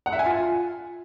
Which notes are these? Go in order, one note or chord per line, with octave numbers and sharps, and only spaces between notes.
F#5
E5
G#5
F4